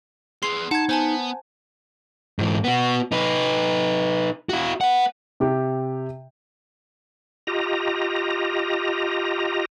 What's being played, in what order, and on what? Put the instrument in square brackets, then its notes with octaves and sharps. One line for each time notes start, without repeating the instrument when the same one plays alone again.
[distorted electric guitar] B3 G#4 [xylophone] C6 C7 F7
[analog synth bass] D#4 [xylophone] F#5 G#6 [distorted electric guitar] A5
[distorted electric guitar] B3 [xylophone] C5 G#5 A5
[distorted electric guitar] G#2 E3
B3 F#4
D#4 B4
E4 F#4
B4 F#5
[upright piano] C3 G4
[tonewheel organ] F4 G4 D#5 A#5